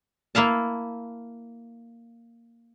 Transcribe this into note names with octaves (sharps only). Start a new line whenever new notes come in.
A#3 E4 F5 A5